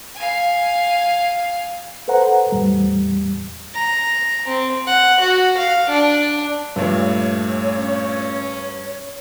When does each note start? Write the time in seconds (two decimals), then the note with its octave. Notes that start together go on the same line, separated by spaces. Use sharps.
0.15 F5 G#5
2.08 A4 B4 C5 F#5 A#5
2.52 E2 A2 G3
3.74 A#5
4.47 C4
4.87 F#5
5.20 F#4
5.57 F5
5.89 D4
6.76 G2 A#2 A3 C#5
7.75 C#4